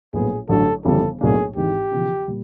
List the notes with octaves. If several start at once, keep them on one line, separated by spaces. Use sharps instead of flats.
A#1 A2 F#3 B3 G#4
A1 G2 D3 F#3 A4
G1 F2 C#3 E3 G3 A4
B1 A2 F#3 A#3 D4 G#4
G#1 G#2 E3 G4
E1 E2 C#3 F3
A#2 G3